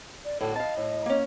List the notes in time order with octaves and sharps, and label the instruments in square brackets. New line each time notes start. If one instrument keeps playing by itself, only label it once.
[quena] D5
[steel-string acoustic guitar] A2 D3 F#4 [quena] A4
[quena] D#5 [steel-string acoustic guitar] F5 A5
[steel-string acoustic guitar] A2
A#3 C#4